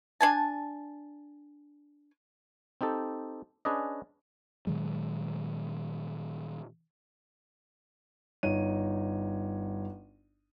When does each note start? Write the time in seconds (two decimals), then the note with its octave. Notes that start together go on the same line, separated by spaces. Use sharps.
0.21 D4 G#5 A5
2.81 C4 D#4 G4 A4
3.65 C#4 D4 G#4 B4 D5 D#5
4.67 A#2 D#3 F#3 G#3
8.43 G1 D#4 C#5 D#7